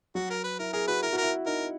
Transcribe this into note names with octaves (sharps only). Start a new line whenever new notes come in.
F#3 F#4
A#4
B4
E4 A#4
G#4 A#4
F#4 B4
E4 A#4
F#4
E4 A#4
D#4 A#4